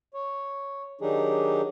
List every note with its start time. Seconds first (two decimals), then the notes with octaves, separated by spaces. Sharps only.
0.14 C#5
1.01 D#3 F#3 D4 D#4 G4 G#4